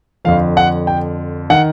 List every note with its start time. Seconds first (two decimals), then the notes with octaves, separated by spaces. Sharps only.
0.25 F2 D3 F3 F5
0.57 F#5
0.87 G5
1.50 D#3 F#5